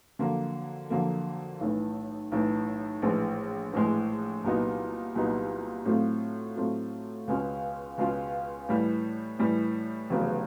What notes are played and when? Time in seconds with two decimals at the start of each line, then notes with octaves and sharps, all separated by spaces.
0.19 F2 D3 F#3 A#3
0.90 F2 D3 F#3 A#3
1.60 B1 A2 E3
2.32 B1 A2 E3
3.02 A#1 A2 E3 G#3
3.73 A#1 A2 E3 G#3
4.44 C2 A#2 F#3 B3 D#4
5.15 C2 A#2 F#3 B3 D#4
5.85 A2 F#3 A3 C4 F4
6.56 A2 F#3 A3 C4 F4
7.27 C#2 B2 G#3 C#4 F4
7.98 C#2 B2 G#3 C#4 F4
8.69 A2 E3 G3
9.39 A2 E3 G3
10.10 F1 E2 C#3 F#3 B3